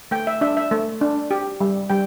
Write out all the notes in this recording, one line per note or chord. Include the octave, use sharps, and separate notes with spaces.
A3 G5
E5
D4 E5
E5
A3
D4
G4
G3
G3 G5